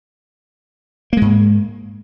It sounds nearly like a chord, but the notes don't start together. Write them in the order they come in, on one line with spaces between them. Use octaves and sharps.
A#3 G#3 G#2